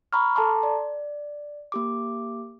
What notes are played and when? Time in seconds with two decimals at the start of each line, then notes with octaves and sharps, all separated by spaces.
0.13 A#5 B5 C#6 F6
0.35 A4 A5 A#5 C6 D6
0.63 D5
1.72 A#3 G4 D6